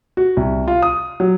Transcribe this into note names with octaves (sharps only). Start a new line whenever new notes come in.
F#4
C2
F4
D#6
F#3